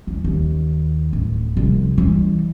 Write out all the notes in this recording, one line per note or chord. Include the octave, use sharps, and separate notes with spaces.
E2
D#2
D1
C2 F3
E3 G3